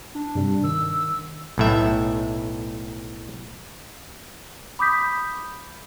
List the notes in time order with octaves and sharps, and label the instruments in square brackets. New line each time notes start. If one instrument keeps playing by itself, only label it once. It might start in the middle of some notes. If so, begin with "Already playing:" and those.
[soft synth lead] D4
[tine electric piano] G2 C3 G3
[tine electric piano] D#3 [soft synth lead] E6
[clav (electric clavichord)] B1 A2 E5
[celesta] B5 D6 D#6 G6 B6